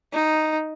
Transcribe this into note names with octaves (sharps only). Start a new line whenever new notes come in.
D#4